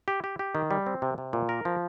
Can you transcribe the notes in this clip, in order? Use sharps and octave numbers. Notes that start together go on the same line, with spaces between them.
G4
G4
G4
D#3
G3
C4
C3
C3
A#2
A#4
F3